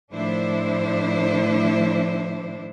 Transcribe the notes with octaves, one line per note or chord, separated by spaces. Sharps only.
A2 D#3 F3 D4 E4 C5